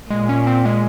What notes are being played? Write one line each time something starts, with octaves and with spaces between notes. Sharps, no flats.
A#2 G#3
C#4
C4
G#3